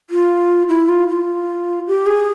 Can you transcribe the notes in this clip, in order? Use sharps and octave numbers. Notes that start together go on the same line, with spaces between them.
F4
E4
F4
F4
G4
G#4